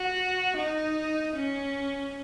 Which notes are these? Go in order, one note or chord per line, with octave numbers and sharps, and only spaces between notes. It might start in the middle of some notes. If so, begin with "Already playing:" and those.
Already playing: F#4
D#4
C#4